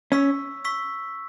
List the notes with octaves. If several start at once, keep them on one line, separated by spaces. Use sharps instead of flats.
C#4 C#6 E6 B6
C#6 E6 B6